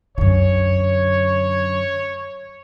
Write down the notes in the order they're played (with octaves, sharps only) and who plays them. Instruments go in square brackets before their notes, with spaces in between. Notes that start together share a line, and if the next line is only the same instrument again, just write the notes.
[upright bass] F#2 D3 [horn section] C#5